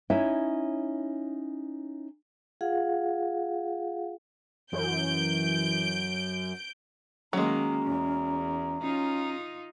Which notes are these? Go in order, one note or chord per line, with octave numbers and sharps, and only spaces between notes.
C#4 D#4 E4 C#5 E5
F4 G#4 F5 F#5
F#2 E3 G6 D7
D#3 F#3 G#3 A#3 C#4 A#5
E2
C#4 D#4 F4